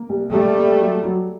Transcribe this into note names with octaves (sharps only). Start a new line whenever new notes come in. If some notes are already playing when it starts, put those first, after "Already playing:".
Already playing: A#3
C2
G3 A3 A#3
A#3
F#3
F#3